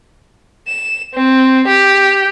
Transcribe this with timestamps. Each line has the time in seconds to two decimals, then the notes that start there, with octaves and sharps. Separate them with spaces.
0.68 E7
1.14 C4
1.68 G4